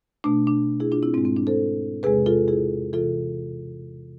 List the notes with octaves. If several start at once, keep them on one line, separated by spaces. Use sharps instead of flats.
B2 A3 D4
D4
E4 G#4
D4 F4
C4 E4
G#2 G#3 C4 E4
C4
D4
A4 C5
E2 C3 G#3 G#4 B4
F4 A4
E4 G#4
C3 E3 F4 A4